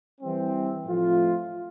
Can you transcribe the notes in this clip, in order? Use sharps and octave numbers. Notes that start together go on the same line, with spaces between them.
E3 G3 C4
A2 F3 A3 C4 F4